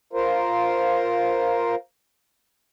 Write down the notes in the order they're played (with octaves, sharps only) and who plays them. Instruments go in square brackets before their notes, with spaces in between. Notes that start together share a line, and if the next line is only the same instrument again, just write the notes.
[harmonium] F4 A#4 C5